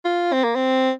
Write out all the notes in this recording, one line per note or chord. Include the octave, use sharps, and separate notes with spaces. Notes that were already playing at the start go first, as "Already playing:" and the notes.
F4
C4
A#3
C4